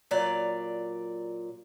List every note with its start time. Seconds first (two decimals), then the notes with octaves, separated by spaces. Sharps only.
0.11 A#2 F#3 D5 F5